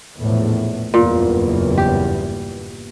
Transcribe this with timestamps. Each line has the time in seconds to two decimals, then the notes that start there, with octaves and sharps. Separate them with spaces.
0.20 A#1 E2 A2
0.94 F#1 E2 G2 A#2
1.78 G4